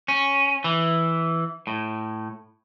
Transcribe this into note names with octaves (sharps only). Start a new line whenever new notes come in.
C#4
E3
A2